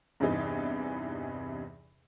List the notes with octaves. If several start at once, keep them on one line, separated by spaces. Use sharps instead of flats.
E2 G2 C3 E3 D#4